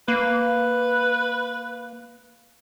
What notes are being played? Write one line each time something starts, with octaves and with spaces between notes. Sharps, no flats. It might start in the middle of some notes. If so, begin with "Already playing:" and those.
A#3 B4